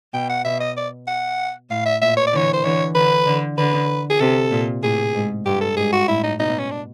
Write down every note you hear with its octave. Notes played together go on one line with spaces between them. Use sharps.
B2 G5
F#5
B2 E5
D#5
D5
F#5
A2 F5
E5
A#2 E5
C#5
D5
D3 E3 C#5
C5
D3 E3 C#5
D3 B4
D3
D3 B4
G#4
C3 A4
A#2
A2 G#4
G#2
G2 G4
A4
G#2 G#4
F#4
A2 E4
D#4
B2 D#4
C#4
D4